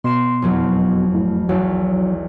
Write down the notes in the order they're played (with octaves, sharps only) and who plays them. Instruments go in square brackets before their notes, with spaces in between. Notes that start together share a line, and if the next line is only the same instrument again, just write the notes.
[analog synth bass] B2 [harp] C6 E7
[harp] F#1 F2 F#3
[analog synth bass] A2
[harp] B1 E2 B2 [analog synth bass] F#3